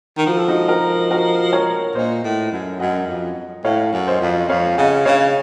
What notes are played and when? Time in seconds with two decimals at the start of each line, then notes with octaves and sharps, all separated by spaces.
0.18 D#3
0.26 F3 F#4
0.37 A4
0.48 D#4 F#4
0.68 F#4 A#4
1.11 F#4 A#4
1.53 A#4 C#5
1.95 A#2 C5 D#5
2.24 A2
2.52 F#2
2.80 F#2 D#5 F#5
3.08 F2
3.64 A2 C#5 F5
3.93 F#2
4.07 C5 D#5
4.21 F2
4.49 F2 C#5 F5
4.78 C#3 D#5 F#5
5.05 C#3 C#5 F5